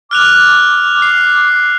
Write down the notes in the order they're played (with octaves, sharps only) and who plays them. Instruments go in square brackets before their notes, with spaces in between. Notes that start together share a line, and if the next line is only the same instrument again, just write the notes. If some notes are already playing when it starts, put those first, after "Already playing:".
[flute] D6 [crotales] F6 F#6 F7
[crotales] C7